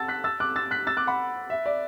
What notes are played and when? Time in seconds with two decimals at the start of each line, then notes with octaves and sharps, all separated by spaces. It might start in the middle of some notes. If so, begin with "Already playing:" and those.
Already playing: F#5 A5 E6 A6
0.08 F#6 B6
0.24 E6 A6
0.40 D6 F#6
0.56 E6 A6
0.71 F#6 B6
0.87 E6 A6
0.97 D6 F#6
1.07 F#5 B5
1.50 E5
1.66 D5